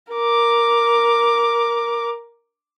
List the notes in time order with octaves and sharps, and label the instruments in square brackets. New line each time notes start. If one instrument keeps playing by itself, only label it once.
[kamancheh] A#4 D6